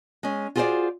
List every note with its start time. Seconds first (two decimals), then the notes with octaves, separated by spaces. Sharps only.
0.23 G#3 C#4
0.56 F4 F#4 G#4 A4 C5 D5